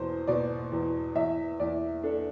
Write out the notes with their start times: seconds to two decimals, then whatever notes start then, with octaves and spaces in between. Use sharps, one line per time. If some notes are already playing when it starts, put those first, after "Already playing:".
Already playing: E2 B2 C5
0.27 B2 D5
0.72 E2
1.15 E2 E5
1.60 E2 D5
2.03 D4 A4